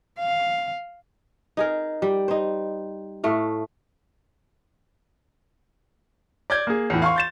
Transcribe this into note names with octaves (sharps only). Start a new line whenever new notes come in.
F5
D#4 G#4 A#4
G3
D#4 C5
A2 A3 F5
D5 G6 G#6
A#3 G#4
E2 A2
F5 C6 C#6
G6 A6 E7